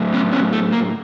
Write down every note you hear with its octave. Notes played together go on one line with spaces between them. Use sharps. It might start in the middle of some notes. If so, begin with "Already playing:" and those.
Already playing: A2 F#3 A3
B3 C#4
B3 C#4
A3
A#3